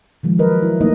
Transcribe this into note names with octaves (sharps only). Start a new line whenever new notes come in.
D#3 F3 G#3
F#3 A#4 B4 D#5
E4
A3 A#3 D#4 D#5